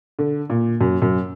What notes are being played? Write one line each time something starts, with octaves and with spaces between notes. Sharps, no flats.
D3
A#2
F#2
F#2